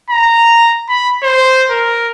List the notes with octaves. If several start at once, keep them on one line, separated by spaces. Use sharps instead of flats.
A#5
B5
C5
A#4